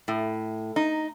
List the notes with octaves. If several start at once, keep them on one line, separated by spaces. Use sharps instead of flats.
A2
D#4